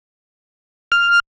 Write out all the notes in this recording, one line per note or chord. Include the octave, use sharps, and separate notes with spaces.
F6